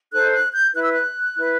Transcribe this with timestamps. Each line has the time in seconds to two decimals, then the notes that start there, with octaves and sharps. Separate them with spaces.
0.12 D#4 A4 C5 F#6
0.33 F#6
0.53 G6
0.74 E4 B4 F#6
0.83 E6
0.92 F#6
1.36 E4 B4